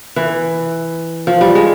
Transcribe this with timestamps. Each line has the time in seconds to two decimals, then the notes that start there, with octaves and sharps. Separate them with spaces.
0.16 E3
1.27 F3
1.41 G3
1.55 G#3